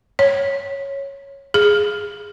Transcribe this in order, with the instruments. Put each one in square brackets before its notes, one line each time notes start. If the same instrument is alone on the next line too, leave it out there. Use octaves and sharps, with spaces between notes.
[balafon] C#5
G#4